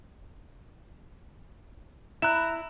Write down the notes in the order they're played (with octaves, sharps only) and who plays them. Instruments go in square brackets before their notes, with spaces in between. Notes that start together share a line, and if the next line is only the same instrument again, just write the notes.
[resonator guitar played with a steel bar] E4 [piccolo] A#5 [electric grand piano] F#6 E7